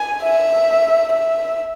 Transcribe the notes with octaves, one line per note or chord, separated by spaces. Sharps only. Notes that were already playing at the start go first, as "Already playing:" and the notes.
Already playing: G#5
E5
E5